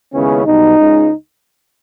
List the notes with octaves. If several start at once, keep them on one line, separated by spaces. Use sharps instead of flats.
D#2 C#3 G#3 B3 C#4 E4
B1 B2 G3 D#4
C#2 C#3 G#3